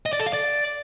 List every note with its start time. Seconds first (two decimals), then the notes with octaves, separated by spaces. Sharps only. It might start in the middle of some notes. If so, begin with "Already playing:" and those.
0.06 D#5
0.13 D5
0.20 A4
0.26 F5
0.33 D5